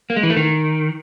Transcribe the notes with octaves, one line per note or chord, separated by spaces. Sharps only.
A#3
G#3
E3
A3
D#3